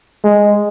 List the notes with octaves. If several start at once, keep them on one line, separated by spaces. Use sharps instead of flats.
G#3